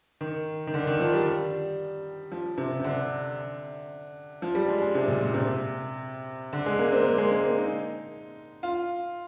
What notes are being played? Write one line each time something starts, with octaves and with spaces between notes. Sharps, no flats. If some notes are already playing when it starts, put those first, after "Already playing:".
D#3
D#3
D3
D#3
F3
G3
F3
C3
C3
D3
F3
G3
G#3
G#3
C3
A#2
A#2
C3
D3
G#3
A#3
C4
A#3
G#3
A#3
C4
D#4
F4